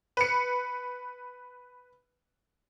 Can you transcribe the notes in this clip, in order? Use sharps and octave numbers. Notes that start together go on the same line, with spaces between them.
B4 C#7